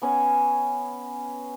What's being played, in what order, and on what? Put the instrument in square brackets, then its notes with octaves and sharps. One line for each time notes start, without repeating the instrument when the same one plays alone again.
[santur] B3 C#4 G#5